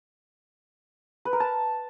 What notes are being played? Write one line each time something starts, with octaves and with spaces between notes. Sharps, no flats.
B4
A#4
A5